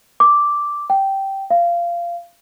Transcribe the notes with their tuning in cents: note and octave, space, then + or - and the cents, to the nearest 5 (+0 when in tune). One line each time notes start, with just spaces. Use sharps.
D6 -5
G5 -10
F5 -20